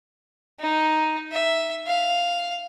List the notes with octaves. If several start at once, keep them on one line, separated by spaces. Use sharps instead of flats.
D#4
E5
F5